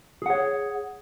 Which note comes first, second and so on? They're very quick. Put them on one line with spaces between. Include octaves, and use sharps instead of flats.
G#4 F#5 C#5